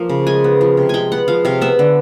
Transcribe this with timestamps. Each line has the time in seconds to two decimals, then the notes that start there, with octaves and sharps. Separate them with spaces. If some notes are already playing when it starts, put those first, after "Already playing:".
Already playing: F3 A#3
0.09 C#3
0.27 G#3 G#5
0.44 B3
0.61 F3
0.77 C3
0.89 G#3 G5 G#5
1.12 B3 F#5
1.28 F3 F5
1.45 C3 F5
1.61 B3 E5
1.79 D3